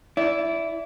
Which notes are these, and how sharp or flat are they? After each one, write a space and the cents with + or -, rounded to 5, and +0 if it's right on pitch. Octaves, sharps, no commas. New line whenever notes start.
E4 +5 D5 -25